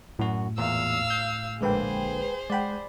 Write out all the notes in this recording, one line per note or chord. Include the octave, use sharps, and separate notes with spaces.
F#2 A2 F#4
E2 A#2 F5 E6
G6
A#1 D3 G#3 A#3 G#4 B4 C5 G5
G#3 D5 F#5 G5 B5